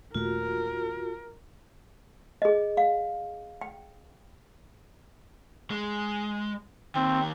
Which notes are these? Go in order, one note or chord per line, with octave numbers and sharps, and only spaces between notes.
D#1 A#2 A3 F4 F#4 A#4
G#4 D#5
F5
G5
G#3
D#2 D#3 C4